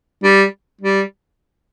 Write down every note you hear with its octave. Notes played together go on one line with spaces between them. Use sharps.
G3
G3